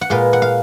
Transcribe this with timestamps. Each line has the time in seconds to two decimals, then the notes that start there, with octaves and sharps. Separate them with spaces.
0.01 F#5
0.10 A#2 G#3 B3 F5
0.33 F#5
0.42 F5